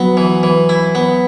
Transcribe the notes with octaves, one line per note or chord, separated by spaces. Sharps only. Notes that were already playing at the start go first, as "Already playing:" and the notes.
Already playing: F#3 B3
E3
E3
E4
B3